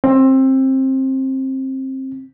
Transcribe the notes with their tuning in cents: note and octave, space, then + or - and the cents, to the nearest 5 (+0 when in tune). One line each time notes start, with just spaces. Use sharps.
C4 +20